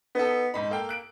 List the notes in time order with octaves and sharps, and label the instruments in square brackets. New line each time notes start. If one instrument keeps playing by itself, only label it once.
[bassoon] B3 [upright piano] D#4 A4
[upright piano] G#2 B5 [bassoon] D#4
[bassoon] A#3 [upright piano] A4 F5 G5
[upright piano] F#6 D7